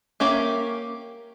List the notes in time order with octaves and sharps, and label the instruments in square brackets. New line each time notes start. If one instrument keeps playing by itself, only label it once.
[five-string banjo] A#3 C#4 G4 A#4 E5